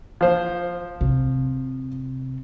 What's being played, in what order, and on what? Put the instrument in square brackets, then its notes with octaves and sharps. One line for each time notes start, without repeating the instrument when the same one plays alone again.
[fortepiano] F3 C5
[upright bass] C3